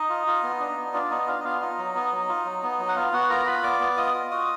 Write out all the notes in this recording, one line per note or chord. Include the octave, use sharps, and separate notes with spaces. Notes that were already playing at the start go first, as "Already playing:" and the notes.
Already playing: D#4 D#5
F4
F4
B3
D4
B3
D4 F4 D5
B3 D#4 D#5
D4 F4 F5
D#5
B3 F4 F5
D#4 F4 D#5
F#3
B3
F#3
F4
F#3
B3
F#3
F#5
B3 F4 F5
B3 F#4 F#5
F4 A#4 A#5
F4 B4 B5
B3 D5 D6
B3
F4 D#5 D#6
F4
F#4 D#5 D#6